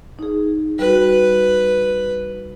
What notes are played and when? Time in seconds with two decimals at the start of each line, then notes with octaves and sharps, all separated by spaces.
0.19 D#4 G#4
0.79 G3 F#4 B4